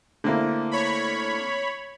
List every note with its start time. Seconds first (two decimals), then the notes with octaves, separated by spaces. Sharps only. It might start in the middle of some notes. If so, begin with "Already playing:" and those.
0.24 D3 A3 A#3 C4 E4
0.71 C#5 B5